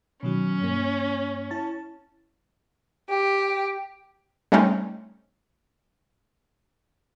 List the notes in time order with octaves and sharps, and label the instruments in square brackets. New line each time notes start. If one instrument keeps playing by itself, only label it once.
[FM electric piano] B2 D#3 F#3 [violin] C#4
[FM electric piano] G2 A#3
E4 A5 A6
[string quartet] G4
[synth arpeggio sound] G3 A3 C4 C#4 D#4